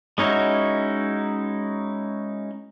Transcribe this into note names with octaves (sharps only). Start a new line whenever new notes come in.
G#3 C#4 D#4 E4 F#4